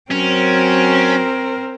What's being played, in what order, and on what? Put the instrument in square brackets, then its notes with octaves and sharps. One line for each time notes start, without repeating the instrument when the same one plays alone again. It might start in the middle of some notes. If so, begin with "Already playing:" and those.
[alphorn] F#3 [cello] C4 A#4 [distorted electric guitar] C#4